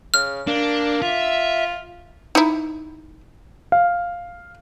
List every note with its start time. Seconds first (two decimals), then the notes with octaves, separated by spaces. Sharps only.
0.14 C#3 F6
0.47 A#3 D4
1.02 F4 E5
2.35 D#4 E4
3.72 F5